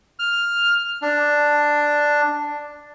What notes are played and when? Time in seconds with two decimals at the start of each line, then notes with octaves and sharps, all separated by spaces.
0.19 F6
1.02 D4